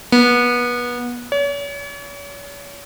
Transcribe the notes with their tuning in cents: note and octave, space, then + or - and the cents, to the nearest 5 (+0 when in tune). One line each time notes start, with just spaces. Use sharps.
B3 -25
C#5 +40